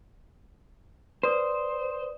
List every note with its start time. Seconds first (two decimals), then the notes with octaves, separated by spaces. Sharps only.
1.23 B4 C5 D5 D#6